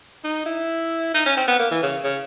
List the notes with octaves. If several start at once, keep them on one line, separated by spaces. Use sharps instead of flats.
D#4
E4
D#4
C#4
C4
B3
A#3
E3
C#3
C#3